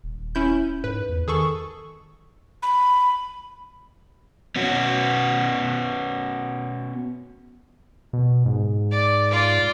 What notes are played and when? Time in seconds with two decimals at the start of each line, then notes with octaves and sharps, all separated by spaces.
0.04 D#1
0.35 C#4 E4 G6
0.84 G#2 B4
1.09 E2
1.28 D#3 G#4 A4 C#6
2.63 B5
4.56 B3 C#4 F#4
8.13 B2
8.46 G#2
8.91 D5
9.30 F4 D5